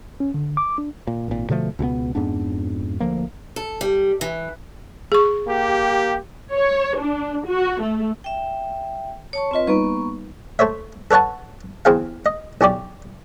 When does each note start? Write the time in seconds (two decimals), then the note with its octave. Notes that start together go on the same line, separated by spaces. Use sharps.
0.20 C#4
0.34 D3
0.57 D6
0.78 D4
1.07 A#2
1.28 G#1 A#2
1.49 B2 D3 F3 A3
1.79 C#2 B2 F3 B3
2.15 F2 G#2 B3 D4
3.00 D2 F3 A#3
3.56 A4
3.81 G3
4.21 E3
5.12 G#4 C#6
5.47 A#3 G4
6.51 C#5
6.98 D4
7.46 F#4
7.82 A3
8.24 E5 G5
9.33 C#5 A5 C#6
9.51 C4 F4 B4 C#5 D#5
9.67 G3 A#3 B3 D#4 B4 C#6
10.59 A3 C5 C#5 E5
11.11 A4 B4 C#5 F#5 A5
11.85 E2 C4 G#4 F5
12.26 D#5
12.61 B1 C#4 G4 D5